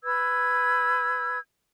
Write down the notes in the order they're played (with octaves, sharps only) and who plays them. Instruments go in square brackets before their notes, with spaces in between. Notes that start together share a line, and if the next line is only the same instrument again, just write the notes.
[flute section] B4 E6 G#6